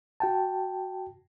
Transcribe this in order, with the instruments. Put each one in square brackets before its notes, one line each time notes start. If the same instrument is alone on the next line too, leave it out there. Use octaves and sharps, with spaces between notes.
[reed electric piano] F#4 G5 A5